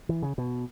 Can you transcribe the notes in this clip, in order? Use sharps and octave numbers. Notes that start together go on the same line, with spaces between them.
E3
C#3
B2